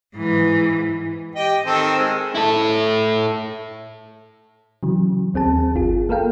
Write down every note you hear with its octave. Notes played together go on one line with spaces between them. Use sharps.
G#2 E3
G4 D#5 G5
D#3 C4 A4
G#3
E4 A4
C#3 E3 F#3
D#2 C4 G#4 A5
G1 F4 G#4
A#3 A4 A#4 F5 G5